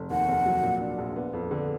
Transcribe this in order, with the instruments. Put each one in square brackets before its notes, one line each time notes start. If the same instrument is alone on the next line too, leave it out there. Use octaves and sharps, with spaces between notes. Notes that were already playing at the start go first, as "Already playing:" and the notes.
Already playing: [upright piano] F1
[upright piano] D#2 [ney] F#5
[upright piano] F1
F#3
A#2
D4
A#1
B3
F2
D3